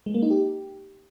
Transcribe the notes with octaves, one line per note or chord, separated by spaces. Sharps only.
G#3
A#3
D#4
G4